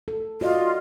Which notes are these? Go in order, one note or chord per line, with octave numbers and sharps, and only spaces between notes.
A4
F4 F#4 D5 D#5